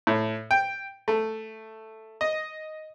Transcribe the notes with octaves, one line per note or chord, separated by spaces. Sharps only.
A2
G5
A3
D#5